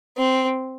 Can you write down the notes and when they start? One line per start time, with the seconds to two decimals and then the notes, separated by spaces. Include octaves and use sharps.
0.17 C4